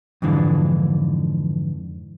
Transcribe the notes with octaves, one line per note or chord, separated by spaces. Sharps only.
F2 G#2 D3 E3 F3